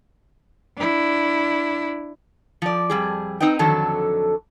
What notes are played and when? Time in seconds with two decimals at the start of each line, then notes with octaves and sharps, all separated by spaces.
0.76 D4 E4
2.62 F3 D5
2.90 F2 G3 G#4
3.40 C4 D#4 B4 D#5 G5
3.59 F2 D3 D#3 F#3 A4 A5